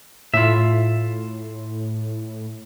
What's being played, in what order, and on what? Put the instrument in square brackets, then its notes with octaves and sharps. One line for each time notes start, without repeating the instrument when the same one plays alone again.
[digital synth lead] A2 [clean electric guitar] F4 E5